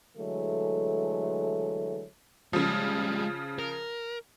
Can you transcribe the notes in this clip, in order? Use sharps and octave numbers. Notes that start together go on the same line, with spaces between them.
D3 E3 F#3 G#3 A3
C#3 F3 G3 G#3
A#4